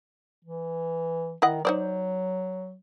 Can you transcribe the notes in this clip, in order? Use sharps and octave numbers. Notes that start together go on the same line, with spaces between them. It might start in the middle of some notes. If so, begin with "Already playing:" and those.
E3
D#3 E4 D#5 F#5
F#3 D#4 C5 D5